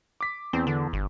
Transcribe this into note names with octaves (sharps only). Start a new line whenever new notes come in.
D6 B6
E2 C4
D3
G1